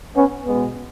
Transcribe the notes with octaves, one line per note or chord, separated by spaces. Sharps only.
B3 C#4
B2 G#3 B3